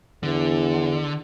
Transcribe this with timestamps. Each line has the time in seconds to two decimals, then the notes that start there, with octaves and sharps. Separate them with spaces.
0.23 E2 D3